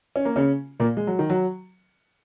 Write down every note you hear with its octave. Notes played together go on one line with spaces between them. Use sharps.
C#4
A#3
C#3 C#4
A#2 A#3
G#3
F#3
D#3
F#3